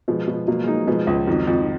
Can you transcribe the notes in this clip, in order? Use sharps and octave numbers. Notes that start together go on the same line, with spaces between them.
B2 F3 G#3
B2
B2 F#3 A#3
G#3
F#3 A#3 D#4
B2 F3 G#3
C#2
F2 D#3 F#3
F2
D#3